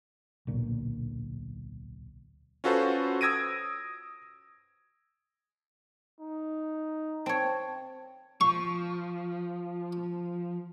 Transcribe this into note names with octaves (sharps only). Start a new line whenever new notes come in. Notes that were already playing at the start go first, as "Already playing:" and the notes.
D1 B1 A#2 D3
C#4 F4 F#4 A4 B4 C5
D#6 E6 G#6 A#6 D7 D#7
D#4
C4 C#5 A5
F3 C#6